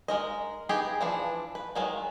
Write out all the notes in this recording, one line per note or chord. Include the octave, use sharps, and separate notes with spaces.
G#3 A#4 D#5
B3 D#4 G4 G#4
E3 F3 D4
B4
D#3 F#3 G#3